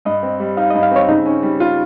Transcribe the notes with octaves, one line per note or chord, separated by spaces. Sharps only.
G2 D#5
C4
G3
D#4 F5
G2 D#5
F5
C4 C#5
C#3 D#4
C#4
G3
F4